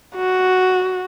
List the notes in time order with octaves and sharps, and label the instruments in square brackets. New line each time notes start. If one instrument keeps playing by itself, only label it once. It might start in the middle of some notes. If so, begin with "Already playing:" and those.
[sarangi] F#4